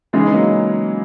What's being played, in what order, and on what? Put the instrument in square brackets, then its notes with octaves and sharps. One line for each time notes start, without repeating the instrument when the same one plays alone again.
[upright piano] C#3 E3 [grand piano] G#3 D#4 G#4
[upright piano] B3
F#3 A#3